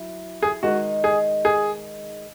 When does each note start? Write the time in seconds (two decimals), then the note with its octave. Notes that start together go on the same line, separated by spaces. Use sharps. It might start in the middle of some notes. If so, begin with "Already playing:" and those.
Already playing: F#3 E4
0.42 G#4
0.63 D#3 G#3 D#4 F#4
1.04 G#4
1.45 G#4